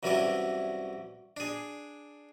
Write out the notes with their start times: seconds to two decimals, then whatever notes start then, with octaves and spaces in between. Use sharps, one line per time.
0.03 C2 E3 F#3 C#4 E4 D5
1.37 D4 G#4